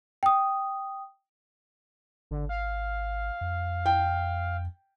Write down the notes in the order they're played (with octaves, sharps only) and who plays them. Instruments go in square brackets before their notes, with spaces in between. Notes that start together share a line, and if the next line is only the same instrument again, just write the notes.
[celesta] G5 D#6
[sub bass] G#1 [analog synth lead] D3
[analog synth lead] F5
[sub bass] F2
[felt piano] G5